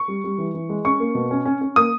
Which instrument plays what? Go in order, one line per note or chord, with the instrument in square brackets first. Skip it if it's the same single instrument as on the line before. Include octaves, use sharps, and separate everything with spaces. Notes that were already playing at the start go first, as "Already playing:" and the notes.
Already playing: [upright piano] C#6
G3
G3
E3
E3
G#3
C#4 C#6
A#3
B2
C#4
C#4
C#4
A#3 D#6